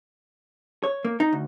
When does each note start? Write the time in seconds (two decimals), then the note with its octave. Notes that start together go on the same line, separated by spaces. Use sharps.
0.84 C#5
1.05 A#3
1.20 D#4
1.33 D2